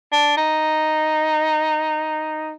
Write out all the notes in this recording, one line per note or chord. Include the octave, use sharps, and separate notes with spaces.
D4
D#4